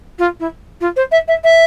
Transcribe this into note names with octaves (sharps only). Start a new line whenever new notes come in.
F4
E4
F4
C5
E5
E5
E5